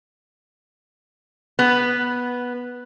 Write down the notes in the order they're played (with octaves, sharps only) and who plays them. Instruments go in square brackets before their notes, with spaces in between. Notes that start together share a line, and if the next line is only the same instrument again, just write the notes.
[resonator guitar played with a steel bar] B3